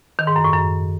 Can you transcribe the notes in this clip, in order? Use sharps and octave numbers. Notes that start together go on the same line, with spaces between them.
D#3
G#2
F#2
A2
F#2